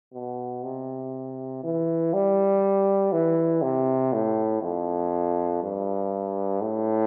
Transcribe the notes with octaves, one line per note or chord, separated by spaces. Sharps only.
B2
C3
E3
G3
E3
C3
A2
F2
G2
A2